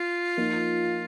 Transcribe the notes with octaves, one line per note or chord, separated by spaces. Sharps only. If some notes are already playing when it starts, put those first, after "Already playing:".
Already playing: F4
F3 A#3 D#4